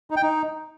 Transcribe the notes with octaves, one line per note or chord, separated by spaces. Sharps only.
D#4
G5
D#4